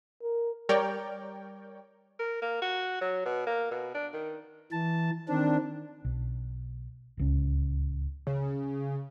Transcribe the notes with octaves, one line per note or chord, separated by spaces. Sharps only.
A#4
G3 A#4 C#5 D5 G5
A#4
A#3
F#4
F#3
B2
A#3
B2
D4
D#3
E3 A5
D#3 C4 D4
B1
D1 C#2 C#4
C#3